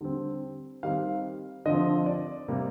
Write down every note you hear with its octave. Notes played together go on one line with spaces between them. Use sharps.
D3 G3 C4
D#3 G3 C4 F5
D3 F3 C4 D#5
D5
C3 G3 A#3